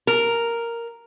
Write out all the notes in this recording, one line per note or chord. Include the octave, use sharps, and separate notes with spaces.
A#4